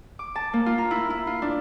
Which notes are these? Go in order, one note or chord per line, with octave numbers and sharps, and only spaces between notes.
D6
A5
A#3
F4
A#5
E4
E4
F4
D4